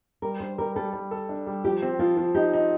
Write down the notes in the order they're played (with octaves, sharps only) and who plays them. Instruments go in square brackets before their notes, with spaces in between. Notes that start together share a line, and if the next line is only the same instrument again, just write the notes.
[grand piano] G3 [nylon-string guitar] A#4
[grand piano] D4 [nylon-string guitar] C5
[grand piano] G3 [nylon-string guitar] A#4
[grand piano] G3 [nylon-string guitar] A4
[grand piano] G3
A4
D4
G3
[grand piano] F3 [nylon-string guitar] G4
[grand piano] C4
[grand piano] F3 [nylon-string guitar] F4
[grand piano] F3
[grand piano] D#4 [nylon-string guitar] G4
[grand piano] D#4